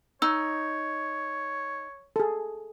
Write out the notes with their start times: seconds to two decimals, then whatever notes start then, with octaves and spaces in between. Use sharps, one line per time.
0.22 D#4 C#5 E6
2.16 G#4 A4